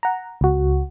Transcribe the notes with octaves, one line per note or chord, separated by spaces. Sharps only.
F#5 A#5
C#2 F#4